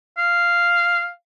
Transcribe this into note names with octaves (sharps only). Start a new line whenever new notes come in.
F5